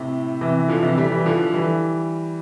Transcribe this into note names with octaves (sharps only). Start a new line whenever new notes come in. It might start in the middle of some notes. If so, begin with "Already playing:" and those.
Already playing: A2 C3
C3 E3
D3 F3
C3 E3
G3
E3 G3
D3 F3
E3 G3